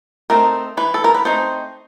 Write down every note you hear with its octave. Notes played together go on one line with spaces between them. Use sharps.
A3 C4 D#4 A#4
E3 B4
A4
A#4
B4
A3 C4 D#4 C5